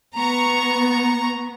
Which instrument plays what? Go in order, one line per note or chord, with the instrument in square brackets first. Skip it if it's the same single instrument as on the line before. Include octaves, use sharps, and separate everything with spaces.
[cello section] B3 [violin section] A#5 C#6